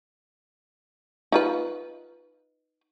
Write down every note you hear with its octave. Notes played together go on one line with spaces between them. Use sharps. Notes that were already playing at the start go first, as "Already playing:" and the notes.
D#4 F4 B4